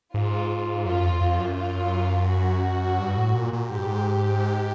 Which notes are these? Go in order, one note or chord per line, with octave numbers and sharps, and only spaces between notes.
G#2 F4
F#2 F4
F2
F2
F#2
F4
F#4
G2
A2
A#2
A#2
G#2 G4
G2
G#2